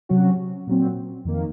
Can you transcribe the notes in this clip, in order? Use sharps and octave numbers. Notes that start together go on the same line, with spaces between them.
C3 F#3 C#4 F#4
A#2 F#3 C4
F2 D#3 A#3